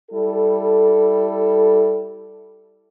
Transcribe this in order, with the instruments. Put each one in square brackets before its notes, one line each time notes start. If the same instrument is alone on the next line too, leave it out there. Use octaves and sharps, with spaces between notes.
[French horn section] G3 E4 A4